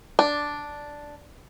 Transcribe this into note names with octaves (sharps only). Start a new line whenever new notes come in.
D4